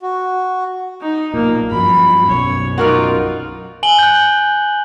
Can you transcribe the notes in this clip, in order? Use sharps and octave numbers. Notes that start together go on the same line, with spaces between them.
F#4
D#4
B1 A#2 A#3
G2 F3 F#3 B5
B1 F#2 B2 C#5
D#4 F4 F#4 A#4 D5
G#5 F#7 G7
F#6 G6